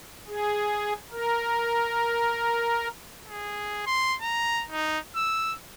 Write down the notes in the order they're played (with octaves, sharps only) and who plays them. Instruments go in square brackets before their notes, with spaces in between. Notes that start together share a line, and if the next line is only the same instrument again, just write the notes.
[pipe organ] G#4
A#4
[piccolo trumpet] G#4
C6
A#5
D#4
E6